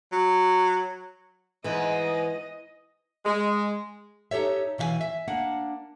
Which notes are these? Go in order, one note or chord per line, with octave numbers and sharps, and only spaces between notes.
F#3
G#2 E3 G#3 B3 D#5
G#3
D#4 G4 A4 C#5 E5
B2 E3 E5 F5 G#5
E5
A#3 D4 F#5